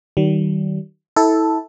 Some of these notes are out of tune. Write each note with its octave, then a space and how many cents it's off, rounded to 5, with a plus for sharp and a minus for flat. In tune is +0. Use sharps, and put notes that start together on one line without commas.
D#3 +0 G3 -40
E4 -25 A4 +0